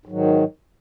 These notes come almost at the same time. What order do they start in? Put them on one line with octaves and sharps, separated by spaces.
G#2 F#3 D#3